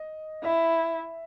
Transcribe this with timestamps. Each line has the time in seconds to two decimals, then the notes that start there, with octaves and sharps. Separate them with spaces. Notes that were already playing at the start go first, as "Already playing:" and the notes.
Already playing: D#5
0.44 E4 E5